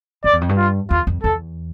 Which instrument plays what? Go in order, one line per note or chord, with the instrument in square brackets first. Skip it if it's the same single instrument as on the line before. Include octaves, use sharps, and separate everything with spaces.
[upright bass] F2 [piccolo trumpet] D5
[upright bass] E2
F2
G2
[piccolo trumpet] F4
[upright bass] E2 [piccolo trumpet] F4
[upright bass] F2
[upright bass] E2 [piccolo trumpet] A4